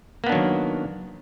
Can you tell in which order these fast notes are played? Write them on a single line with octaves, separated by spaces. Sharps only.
A#3 B3 D4 F#3 D#3